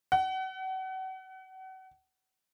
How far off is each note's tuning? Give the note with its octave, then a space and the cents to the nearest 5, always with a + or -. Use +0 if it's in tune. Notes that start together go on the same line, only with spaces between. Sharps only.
F#5 +35